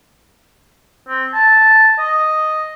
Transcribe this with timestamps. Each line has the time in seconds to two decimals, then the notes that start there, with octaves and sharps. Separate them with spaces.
1.08 C4
1.33 A5
1.99 D#5